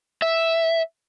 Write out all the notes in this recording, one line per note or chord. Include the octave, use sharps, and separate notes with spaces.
E5